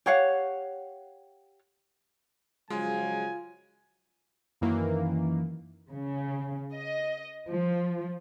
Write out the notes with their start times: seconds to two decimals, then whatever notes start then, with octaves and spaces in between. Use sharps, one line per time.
0.06 G4 C#5 F5 F#5
2.70 C#3 F3 F#3 G#3 F4 G#5
4.61 F#2 D#3 E3 A#3
5.89 C#3
6.74 D#5
7.46 F3